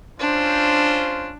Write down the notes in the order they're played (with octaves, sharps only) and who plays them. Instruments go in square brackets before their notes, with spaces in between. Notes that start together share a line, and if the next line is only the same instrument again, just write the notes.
[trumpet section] C#4 F4 C5 [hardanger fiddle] D4